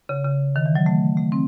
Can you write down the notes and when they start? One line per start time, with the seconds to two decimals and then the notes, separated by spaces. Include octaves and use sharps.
0.09 C#3
0.25 C#3
0.56 D#3
0.66 E3
0.75 F#3
0.86 A3
1.17 A3
1.32 C4